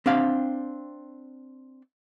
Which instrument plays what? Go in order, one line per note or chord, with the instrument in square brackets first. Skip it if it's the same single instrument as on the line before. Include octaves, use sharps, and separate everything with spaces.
[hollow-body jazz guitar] C4 D4 G4 F5